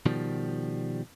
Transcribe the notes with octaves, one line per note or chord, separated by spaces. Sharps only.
B2 D#3 F3 G3